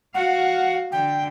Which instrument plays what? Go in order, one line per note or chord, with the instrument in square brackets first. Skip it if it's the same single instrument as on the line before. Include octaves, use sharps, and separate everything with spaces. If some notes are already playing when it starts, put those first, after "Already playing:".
[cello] F#4 F5 [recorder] F#5
[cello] D3 [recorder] G5